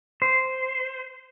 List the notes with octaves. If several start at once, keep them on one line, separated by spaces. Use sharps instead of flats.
C5